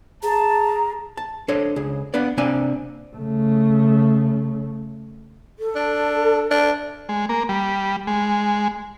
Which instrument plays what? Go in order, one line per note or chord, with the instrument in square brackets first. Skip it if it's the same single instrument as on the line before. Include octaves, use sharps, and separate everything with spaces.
[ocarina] G#4 [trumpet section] A5 [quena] A#5
[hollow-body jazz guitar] A5
D4 A4 C5 C#5 D#5
C#2 G#4
A#3 B3 D4 B4 D5
C3 A#3 C4 D4 G#5
[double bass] C#3 A3
[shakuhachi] A4
[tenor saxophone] D4
D4
[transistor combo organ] G#3
A#3
G3
G#3